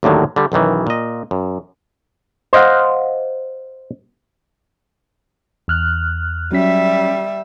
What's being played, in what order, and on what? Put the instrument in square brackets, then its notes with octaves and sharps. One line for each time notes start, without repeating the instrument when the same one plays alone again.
[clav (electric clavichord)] D#2 A2 D3 D#3 F#3
D3 G3
B1 F#2 D#3 E3
A#2 D#5
F#2
C5 D#5 F5 F#5
[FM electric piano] E2 F6 F#6
[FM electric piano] F#3 C#4 B6 [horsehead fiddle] G3 E5